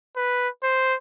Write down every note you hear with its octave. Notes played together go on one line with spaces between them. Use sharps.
B4
C5